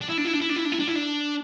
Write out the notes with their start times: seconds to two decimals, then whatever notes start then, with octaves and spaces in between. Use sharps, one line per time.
0.01 D4
0.09 E4
0.18 D4
0.25 E4
0.33 D4
0.41 E4
0.49 D4
0.56 E4
0.65 D4
0.72 E4
0.79 D4
0.88 E4
0.96 D4